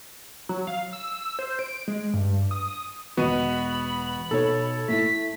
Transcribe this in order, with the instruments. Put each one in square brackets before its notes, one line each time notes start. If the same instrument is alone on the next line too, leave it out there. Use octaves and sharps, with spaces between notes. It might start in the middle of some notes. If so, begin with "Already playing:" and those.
[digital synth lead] F#3
F5
E6
C5
D7
G#3
G2
D#6
[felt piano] E1 D#5 D#7 [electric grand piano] B3 F#4 [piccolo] B5
[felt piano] B2 D#4 [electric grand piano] A4 C#5
[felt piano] A3 E4 [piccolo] B6